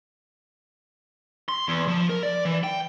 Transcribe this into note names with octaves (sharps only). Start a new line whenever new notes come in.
C6
E2
F3
A#4
D5
E3
G5